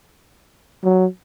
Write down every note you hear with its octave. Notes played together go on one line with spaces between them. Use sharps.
F#3